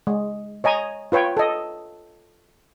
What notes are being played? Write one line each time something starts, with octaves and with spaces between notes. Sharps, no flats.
G#3
C#5 D#5 G#5 A#5
F4 B4 C#5 G5
A4 D#5